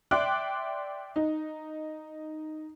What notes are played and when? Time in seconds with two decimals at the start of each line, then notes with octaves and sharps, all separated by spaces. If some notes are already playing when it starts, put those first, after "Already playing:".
0.11 D5 E5 G5 C6 D6 F#6
1.16 D#4